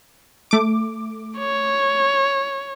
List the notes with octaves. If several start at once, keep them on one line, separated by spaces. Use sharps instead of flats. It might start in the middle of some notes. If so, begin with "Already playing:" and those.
A3 D6
C#5